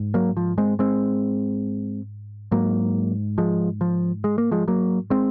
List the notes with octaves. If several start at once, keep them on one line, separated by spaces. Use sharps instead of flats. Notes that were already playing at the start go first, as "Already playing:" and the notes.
Already playing: G#2
F#3 A#3
F3
G#3 C4
G#3 C4
G#2 F#3 A#3
F3 G#3
F3
G#3
A#3
F3 G#3
F#3 A#3
G#3 C4